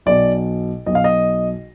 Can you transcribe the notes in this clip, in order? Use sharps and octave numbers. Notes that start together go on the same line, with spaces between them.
B1 B2 D5
B1 B2 D#5
F5
D#5